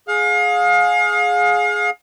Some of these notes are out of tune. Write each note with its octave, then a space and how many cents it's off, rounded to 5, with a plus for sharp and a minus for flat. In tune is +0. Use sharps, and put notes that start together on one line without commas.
G#4 +10 F5 +35